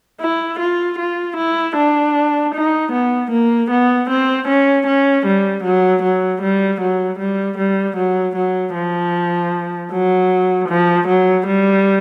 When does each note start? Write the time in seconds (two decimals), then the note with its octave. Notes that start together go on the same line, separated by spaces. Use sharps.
0.21 E4
0.60 F4
0.99 F4
1.37 E4
1.77 D4
2.55 D#4
2.92 B3
3.31 A#3
3.71 B3
4.10 C4
4.48 C#4
4.87 C#4
5.26 G3
5.64 F#3
6.03 F#3
6.42 G3
6.81 F#3
7.19 G3
7.58 G3
7.97 F#3
8.36 F#3
8.75 F3
9.92 F#3
10.69 F3
11.08 F#3
11.47 G3